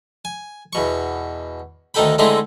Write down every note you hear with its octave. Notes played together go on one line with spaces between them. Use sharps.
G#5
E2 B2 C#6
D2 D#3 D#4 A4 G5 B5
D3 G#3 A3 C4 D#4 E4